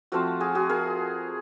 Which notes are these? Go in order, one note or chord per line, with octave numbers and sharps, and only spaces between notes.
F3 A3 C4 F4 F#4
F#4 G#4
F#4 G#4
G#4 A#4